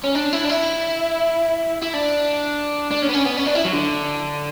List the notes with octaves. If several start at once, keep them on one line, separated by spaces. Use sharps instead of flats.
C#4
D4
E4
D4
E4
E4
D4
D4
C#4
B3
C#4
B3
C#4
D4
E4
F#3
D3